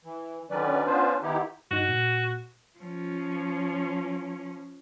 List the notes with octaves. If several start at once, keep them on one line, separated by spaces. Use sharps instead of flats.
E3
D3 D#3 F#3 C#4 B4 D5
B3 C#4 D4 F4 B4 C5
D#3 B3 D#4 E4 G4
G2 D#4 F#4
A#2
F3 C#4